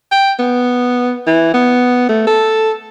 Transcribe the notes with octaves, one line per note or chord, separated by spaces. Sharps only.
G5
B3
E3
B3
A3
A4